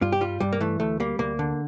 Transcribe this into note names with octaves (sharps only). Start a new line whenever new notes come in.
G2 F4
G4
G3 F4
G2 G3
A#3
E3 A3
D2 A3
G3 A#3
D2 A#3
D3